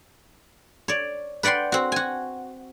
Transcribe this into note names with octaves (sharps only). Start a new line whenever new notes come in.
C#5 D5
B4 D5 F#5 G5 C6
C4 F#4
F#4 G#5